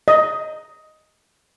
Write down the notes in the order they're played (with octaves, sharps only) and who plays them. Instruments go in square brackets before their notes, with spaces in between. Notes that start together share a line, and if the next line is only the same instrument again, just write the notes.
[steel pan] D#5